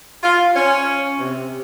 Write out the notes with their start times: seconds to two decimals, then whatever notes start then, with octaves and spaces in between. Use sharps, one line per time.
0.23 F4
0.55 C#4
1.19 C3